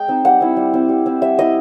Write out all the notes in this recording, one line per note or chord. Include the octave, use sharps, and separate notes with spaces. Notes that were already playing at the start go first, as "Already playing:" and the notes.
Already playing: G#3 G5
C4 D#4
G3 F#5
C4 E4
G3
C4 E4
G3
C4 E4
G3 E5
C4 E4 D#5